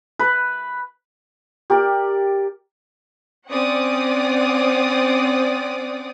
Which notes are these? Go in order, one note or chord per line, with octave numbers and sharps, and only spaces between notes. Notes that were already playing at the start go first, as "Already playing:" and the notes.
B4
G4 A#4 D5
C4 C#4 D5 F#5 D6 D#6